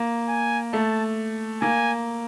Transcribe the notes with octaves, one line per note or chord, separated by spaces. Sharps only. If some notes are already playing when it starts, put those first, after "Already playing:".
Already playing: A#3
G#5
A3 A5
A#3 G#5